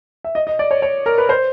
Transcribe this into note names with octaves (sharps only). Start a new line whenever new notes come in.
E5
D#5
D#5
D5
C#5
C#5
A#4
B4
C5